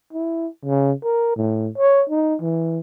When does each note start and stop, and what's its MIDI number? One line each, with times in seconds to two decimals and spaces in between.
0.13 0.47 64
0.65 0.92 49
1.04 1.34 70
1.36 1.68 45
1.78 2.04 73
2.09 2.35 63
2.41 2.79 52